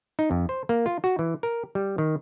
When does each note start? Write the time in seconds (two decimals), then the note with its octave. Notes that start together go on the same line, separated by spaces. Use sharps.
0.19 D#4
0.31 F2
0.49 C5
0.69 A#3
0.86 F4
1.04 F#4
1.19 E3
1.43 A#4
1.75 G3
1.98 D#3